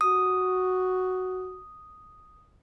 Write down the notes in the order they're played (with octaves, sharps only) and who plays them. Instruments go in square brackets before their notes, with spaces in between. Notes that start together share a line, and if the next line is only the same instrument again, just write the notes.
[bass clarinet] F#4 [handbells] D#6